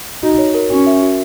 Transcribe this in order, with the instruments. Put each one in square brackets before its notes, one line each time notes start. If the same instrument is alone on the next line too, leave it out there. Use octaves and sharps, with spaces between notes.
[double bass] D#4 [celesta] F#4
[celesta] C#5
A#4
[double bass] C#4 [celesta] F#4
[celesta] E5
F#4